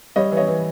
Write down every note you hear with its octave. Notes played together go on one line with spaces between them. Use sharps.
G3 C#5 D#5
E3
C#5 D#5
E3